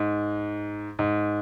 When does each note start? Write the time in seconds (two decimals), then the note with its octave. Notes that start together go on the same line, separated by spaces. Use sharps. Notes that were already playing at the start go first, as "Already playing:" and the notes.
Already playing: G#2
0.99 G#2